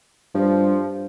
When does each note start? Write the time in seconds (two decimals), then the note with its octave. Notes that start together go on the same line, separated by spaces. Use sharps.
0.34 G2 F3